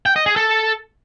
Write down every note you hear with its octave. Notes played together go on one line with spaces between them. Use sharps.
G5
D#5
G#4
A4